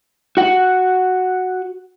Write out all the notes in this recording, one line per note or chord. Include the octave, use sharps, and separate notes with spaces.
F#4 F#5